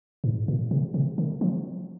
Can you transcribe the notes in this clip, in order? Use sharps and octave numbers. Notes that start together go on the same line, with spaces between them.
G#2
A#2
C3
C3
D3
F3